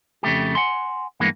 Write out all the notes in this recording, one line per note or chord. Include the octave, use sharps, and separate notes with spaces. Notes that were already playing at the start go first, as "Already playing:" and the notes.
F2 C#3 A3 G4
F#5 G#5 C6
G2 E3 G#3 A#3 B3